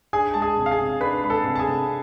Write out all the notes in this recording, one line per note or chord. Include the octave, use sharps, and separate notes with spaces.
D4 G#4 G#5
G#3 A5
G#4 G#5
C3
F5
G#4 G#5
C3
D4 B4 B5
G#3 B5
A4 A5
C3
A5
G#4 G#5
C3